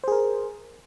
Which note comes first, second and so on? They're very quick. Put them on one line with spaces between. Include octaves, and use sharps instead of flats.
C5 G#4 A#4